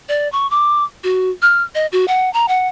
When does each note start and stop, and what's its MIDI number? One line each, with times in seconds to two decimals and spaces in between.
0.09 0.30 74
0.32 0.49 85
0.51 0.84 86
1.04 1.30 66
1.42 1.63 89
1.75 1.87 75
1.92 2.06 66
2.08 2.31 78
2.33 2.46 82
2.48 2.68 78